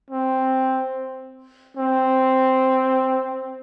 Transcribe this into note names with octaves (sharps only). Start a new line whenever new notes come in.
C4
C4